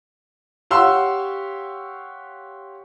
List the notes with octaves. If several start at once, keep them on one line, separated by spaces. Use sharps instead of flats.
G4 C#5 F5 F#5 C6 E6